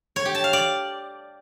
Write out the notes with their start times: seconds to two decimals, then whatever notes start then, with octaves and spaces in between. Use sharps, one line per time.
0.16 C#5
0.25 G4
0.35 A5
0.44 F5
0.53 D5